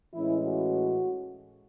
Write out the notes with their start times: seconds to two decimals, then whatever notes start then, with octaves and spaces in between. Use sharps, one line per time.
0.13 A2 E3 G#3 C#4 E4
0.45 F#4